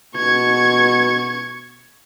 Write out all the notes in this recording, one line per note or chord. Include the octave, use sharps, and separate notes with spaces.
B2 C#6 G#6